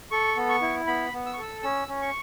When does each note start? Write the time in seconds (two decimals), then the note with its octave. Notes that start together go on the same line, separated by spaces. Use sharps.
0.11 A4 C#6
0.37 B3
0.49 C#6
0.62 E4
0.87 B3 B5
1.13 B3
1.26 E6
1.33 C#6
1.38 A4 E6
1.63 C#4 E6
1.88 C#4
2.01 C#6